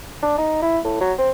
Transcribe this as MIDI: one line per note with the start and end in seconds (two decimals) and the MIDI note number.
0.23 0.35 62
0.38 0.59 63
0.62 0.79 64
0.85 1.00 45
1.01 1.13 54
1.18 1.31 60